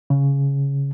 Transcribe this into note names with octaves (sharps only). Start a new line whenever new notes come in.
C#3